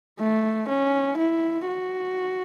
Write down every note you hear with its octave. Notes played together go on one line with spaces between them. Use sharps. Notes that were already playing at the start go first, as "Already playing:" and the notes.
A3
C#4
E4
F#4